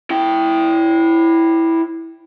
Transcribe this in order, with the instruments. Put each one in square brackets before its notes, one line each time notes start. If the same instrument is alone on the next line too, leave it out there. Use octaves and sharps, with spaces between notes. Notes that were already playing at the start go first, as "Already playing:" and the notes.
[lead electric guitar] E4 G5